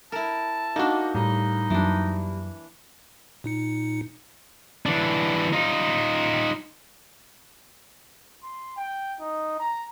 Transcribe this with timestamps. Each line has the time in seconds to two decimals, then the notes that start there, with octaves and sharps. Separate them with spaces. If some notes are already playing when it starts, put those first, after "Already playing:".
0.12 E4 A#4 A5
0.76 A#3 D4 D#4 F#4
1.15 A2 G3 D#4
1.70 F#2 E3 F#3 A#3 D4
3.44 A#2 D#4 C#7
4.86 E3 D4
5.53 D#4 F4
8.43 C6
8.77 G5
9.21 D#4
9.60 A#5